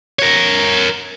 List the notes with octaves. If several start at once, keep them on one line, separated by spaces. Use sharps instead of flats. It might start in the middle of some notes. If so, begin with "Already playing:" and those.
A#4 C#5